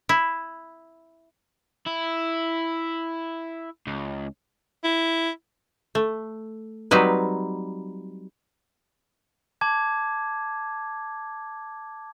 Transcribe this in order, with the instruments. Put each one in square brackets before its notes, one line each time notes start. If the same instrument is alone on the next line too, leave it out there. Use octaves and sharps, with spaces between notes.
[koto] E4
[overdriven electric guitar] E4
C#2
[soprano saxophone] E4
[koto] A3
F#3 G3 C4 D#4 B4
[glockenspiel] A5 D6 G#6